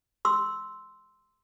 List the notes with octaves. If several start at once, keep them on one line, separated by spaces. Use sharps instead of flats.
C6 E6